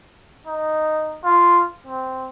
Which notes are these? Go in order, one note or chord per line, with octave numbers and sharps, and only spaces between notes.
D#4
F4
C4